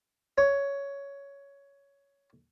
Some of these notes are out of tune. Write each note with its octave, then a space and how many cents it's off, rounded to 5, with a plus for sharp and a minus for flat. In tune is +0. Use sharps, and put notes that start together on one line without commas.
C#5 +10